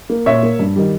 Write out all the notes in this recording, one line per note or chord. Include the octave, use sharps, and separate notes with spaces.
A#3
A#2 C#5 E5
A#3
G2
D#3 G3